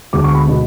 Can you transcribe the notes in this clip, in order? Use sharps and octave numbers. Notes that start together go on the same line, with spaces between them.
D2 D3 G#3 B3 D6
C#6
B5
B2 G#3